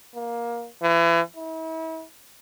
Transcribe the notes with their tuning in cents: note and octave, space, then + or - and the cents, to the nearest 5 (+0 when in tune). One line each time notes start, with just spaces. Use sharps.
A#3 +15
E3 +35
E4 -40